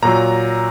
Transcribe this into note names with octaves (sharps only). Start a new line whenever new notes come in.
A#2 F#3 A#5